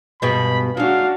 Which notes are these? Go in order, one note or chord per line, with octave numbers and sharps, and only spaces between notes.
G2 B2 G#3 B5
F#3 G#3 D4 F#4 F5